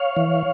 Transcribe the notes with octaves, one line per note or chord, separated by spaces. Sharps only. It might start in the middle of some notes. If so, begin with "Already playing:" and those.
Already playing: C#5 F5
E3